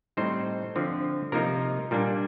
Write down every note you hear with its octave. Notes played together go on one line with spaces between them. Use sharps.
A2 G3 C4 D#4 C5
D3 F3 C4
C3 F3 A#3 D#4 A#4
A#2 G3 A#3 D4